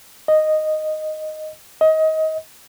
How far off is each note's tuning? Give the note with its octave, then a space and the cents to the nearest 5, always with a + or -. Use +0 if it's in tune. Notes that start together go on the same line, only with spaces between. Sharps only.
D#5 -5
D#5 +25